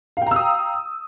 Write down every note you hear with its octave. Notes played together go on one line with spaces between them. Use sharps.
F5 G5 A#5 D#6 E6